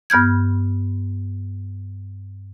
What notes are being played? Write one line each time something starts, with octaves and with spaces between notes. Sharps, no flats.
G2 B3 F6 G6 G#6